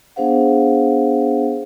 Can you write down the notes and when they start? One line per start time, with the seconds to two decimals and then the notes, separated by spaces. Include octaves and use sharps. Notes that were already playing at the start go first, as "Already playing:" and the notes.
0.16 B3 D4 G#4 C5 F5 F#5